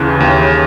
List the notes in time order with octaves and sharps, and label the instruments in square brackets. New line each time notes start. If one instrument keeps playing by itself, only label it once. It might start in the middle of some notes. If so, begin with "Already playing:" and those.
Already playing: [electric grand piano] D#2 C#3 E3 F#6
D#2